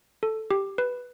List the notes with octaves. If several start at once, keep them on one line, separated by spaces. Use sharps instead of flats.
A4
G4
B4